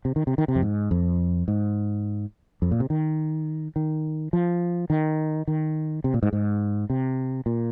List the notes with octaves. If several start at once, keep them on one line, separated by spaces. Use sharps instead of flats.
C3
D#3
C3
D#3
C3
F2
G#2
F2
G#2
F2
A#2
C3
D#3
D#3
F3
D#3
D#3
C3
A#2
G#2
G#2
C3
A#2